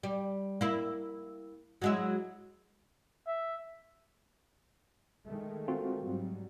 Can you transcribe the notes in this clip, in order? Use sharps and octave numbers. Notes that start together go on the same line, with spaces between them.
G3
A#3 E4
F#3 G#3 E4
E5
D#3 G#3 A3
C4 F4 F#4
G#2 F#3 G3